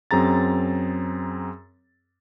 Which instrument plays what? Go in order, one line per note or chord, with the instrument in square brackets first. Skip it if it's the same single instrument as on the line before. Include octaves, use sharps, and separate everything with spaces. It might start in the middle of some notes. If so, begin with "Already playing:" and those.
[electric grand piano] F#2 C4 G#4 A#5 A6